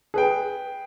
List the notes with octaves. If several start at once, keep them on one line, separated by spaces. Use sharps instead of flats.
G#4 B4 G5